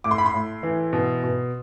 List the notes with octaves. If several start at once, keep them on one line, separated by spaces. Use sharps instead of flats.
A2 D6
C6
B5
C6
A2
E3
B2
B2